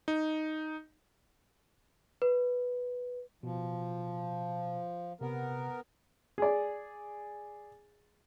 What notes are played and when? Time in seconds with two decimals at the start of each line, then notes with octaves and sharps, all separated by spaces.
0.08 D#4
2.22 B4
3.43 B2 F3
5.21 C3 B3 A#4 F#5
6.38 G#4 D5